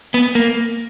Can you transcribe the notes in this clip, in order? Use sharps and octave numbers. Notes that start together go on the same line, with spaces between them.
B3
A#3